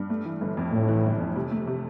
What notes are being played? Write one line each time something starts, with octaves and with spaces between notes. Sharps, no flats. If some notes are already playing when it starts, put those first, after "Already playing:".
Already playing: G2
A3
E3
G1
F2
A2 A3
E3
G1
F2
C3
A3
C3